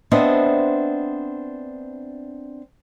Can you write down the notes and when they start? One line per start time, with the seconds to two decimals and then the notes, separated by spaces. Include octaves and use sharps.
0.12 B3 C4 D4 C5 D#5 E5